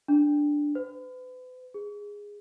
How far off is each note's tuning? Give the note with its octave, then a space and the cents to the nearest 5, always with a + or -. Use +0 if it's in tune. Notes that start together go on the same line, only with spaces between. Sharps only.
D4 +0
B4 +40
G#4 -10